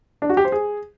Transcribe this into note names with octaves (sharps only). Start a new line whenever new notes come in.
D4
F#4
G4
C5
G#4